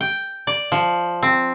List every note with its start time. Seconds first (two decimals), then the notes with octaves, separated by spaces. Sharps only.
0.01 G5
0.47 D5
0.72 F3
1.23 C4